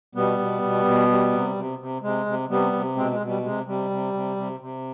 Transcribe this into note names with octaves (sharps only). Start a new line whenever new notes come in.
B2 G3 B3
B2
B2
B2
G3
C3
C3
C3
C3 G#3
C3
C3 G3 B3
C3
B2 G#3 C4
G#3
B2
G3
C3 G#3
C3 G3
C3
C3
C3
C3